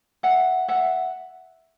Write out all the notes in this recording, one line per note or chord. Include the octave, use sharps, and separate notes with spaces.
E5 F#5
E5 F#5